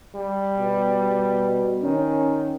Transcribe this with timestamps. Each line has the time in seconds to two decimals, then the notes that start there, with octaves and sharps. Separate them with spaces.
0.15 G3
0.58 B2
1.83 D#3 C#4